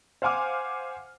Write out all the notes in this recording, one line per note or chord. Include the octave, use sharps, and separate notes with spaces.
C5 F5 F#5 G#5 D6 F6